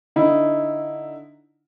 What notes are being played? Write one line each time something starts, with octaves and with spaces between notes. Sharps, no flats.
D3 D#4 E4